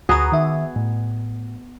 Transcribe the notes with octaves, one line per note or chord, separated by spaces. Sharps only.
D2 B3 F#4 G#4 A#5
D#3 E5
A2